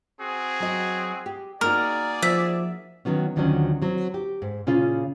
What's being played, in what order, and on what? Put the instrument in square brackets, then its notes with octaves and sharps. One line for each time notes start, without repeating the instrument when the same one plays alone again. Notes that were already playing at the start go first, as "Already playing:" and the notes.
[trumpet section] C4 F#4 G#4
[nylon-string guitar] F#3 D#5
G4
[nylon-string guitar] A#3 D#4 F#4 [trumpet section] G#4 D5 [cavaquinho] A#4
[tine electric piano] F3 [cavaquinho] E5
[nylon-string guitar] D#3 F#3 B3 C#4
D2 D3 D#3 F3 F#3 C#4
F#3 C4
G4
G#2
A#2 C#3 C#4 F4